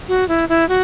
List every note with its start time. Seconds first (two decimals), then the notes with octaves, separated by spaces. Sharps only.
0.08 F#4
0.28 E4
0.49 E4
0.69 F#4